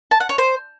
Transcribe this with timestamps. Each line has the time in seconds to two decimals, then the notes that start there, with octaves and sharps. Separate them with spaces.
0.11 A5
0.20 F#5
0.29 C#5
0.38 C5